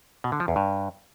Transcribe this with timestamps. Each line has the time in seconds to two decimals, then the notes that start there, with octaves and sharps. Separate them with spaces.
0.24 B2
0.32 D3
0.40 F3
0.48 E2
0.56 G2